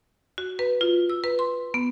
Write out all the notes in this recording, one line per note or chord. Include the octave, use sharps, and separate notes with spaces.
F#4
B4
F4
E6
B4
C6
B3